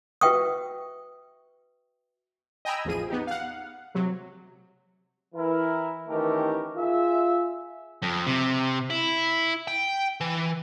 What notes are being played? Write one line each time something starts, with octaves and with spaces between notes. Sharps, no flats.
F#4 B4 E5 G5 C#6 D#6
D#5 G5 G#5 A#5 B5 E6
A1 E2 F3 G#4 D#7
B3 D#4 G4
F5 F#5
C3 F#3
E3 E4 A#4
D#3 E3 A3 C#4 G4 A#4
F4 G#4 E5
F2
C3
E4
G5
E3